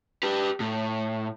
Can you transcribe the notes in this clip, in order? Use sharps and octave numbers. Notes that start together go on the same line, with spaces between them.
G4 B4
A2